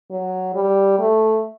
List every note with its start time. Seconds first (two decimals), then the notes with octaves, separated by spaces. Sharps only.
0.10 F#3
0.54 G3
0.99 A3